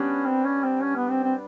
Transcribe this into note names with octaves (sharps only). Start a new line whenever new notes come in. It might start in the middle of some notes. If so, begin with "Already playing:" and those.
Already playing: G3 B3 C#4 D4
C4
C#4
C4
C#4
B3
C4
C4